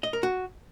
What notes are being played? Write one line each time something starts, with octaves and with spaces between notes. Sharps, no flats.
D#5
A#4
F#4